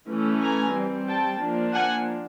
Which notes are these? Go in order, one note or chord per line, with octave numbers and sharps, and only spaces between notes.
E3 A3 C#4
G#5 A#5
G3 C4
G5 A5
F3 A#3 D4
F#5 G#5